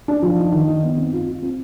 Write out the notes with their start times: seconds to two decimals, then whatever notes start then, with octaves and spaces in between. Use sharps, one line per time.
0.08 D4
0.22 F3
0.38 D#4
0.53 D#3
0.68 D#4
0.83 B3
0.97 C4
1.12 F4
1.28 F4
1.42 C4